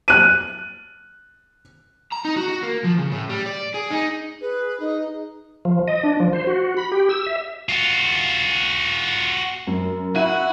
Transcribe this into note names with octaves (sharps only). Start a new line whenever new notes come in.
F#6 D#7
A#5
D#4
F#4
F#4
A#3
F3
C#3
A2
G3
D5
G#4
D#4
G#4 B4
D#4
F3
D#5
D4
F3
C5
F#4
B5
G4
E6
E5
F4 F#4
F#2
E4 F#4 E5 F#6 D#7